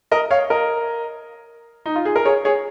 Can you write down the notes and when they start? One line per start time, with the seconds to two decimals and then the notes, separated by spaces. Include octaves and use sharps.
0.11 A#4 D#5
0.31 C#5 F5
0.50 A#4 D#5
1.86 D#4
1.95 F4
2.05 G#4
2.16 A#4
2.25 G#4 C#5
2.45 G#4 C#5